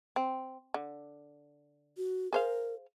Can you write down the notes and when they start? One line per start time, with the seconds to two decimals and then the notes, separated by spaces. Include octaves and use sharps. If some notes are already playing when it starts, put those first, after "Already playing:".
0.16 C4
0.74 D3
1.97 F#4
2.33 G#4 A#4 C5 F5